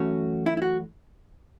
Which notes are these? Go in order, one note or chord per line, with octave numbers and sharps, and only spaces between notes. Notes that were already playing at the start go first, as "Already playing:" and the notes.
Already playing: F#2 E3 A3 C#4 F#4
E4
E4
F#4